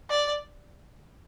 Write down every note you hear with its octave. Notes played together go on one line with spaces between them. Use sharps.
D5